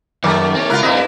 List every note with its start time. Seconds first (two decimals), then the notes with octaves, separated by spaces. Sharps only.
0.24 F#2 D#3 G3 A3 A#3
0.55 C4 C#5
0.70 C#2 E4 F4 A#4 B4
0.83 G2 C4 E4 A#4 B4 D#5